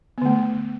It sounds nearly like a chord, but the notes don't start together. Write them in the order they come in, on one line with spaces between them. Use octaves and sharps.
B3 D3 A3